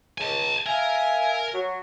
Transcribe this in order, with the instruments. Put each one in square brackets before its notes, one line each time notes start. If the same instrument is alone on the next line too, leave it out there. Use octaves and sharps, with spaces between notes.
[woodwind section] C#2 [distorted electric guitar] G#5 A5
[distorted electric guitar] A#4 [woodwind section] E5 F5 G#5
[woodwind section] F#3